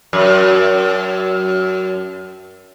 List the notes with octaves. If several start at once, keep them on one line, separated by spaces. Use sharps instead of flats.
F#2